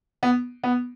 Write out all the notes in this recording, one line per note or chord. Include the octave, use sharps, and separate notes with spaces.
B3
B3